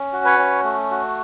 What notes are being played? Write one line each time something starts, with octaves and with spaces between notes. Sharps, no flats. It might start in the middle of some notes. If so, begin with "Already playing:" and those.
Already playing: C#4
F#4
B4 C#5
C#4
A3
F#4